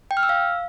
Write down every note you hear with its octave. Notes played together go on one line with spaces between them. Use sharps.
G5
F6
E6
F5